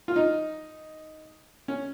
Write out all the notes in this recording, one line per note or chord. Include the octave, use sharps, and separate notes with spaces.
F4
D#4
C#4